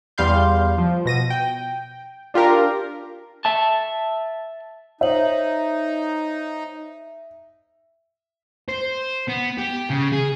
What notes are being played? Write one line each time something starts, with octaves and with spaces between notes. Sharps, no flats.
E2 G3 F5 C6 G6
F3
B2 A#6 D#7
G5
D4 F4 G4 A#4
E5 A5
D#4 C5 C#5 E5 F#7
C5
B3
G4
C#3
G#4